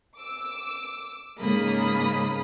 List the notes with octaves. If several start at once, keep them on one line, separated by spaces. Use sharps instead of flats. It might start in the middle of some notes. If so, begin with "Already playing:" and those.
D6 E6
G#2 C#3 G#3 A#3 B5 D#6